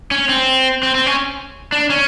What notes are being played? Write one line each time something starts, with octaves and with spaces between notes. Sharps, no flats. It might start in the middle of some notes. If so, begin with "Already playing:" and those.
C#4
C4
C4
C4
C#4
D4
C#4